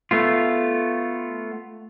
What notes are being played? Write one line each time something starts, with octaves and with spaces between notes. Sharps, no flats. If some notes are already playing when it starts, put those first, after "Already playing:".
A3 B3 F4